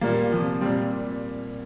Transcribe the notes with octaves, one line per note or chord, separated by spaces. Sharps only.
A#2 G3 A#3
C3 F3
A#2 G3 C4